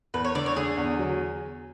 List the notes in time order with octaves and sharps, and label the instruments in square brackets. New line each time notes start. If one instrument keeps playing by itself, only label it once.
[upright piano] E2 [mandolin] B4
[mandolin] C#5
[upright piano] D3 [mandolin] D5
[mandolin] C#5
[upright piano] D3 [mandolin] G#4
[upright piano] E2
F#3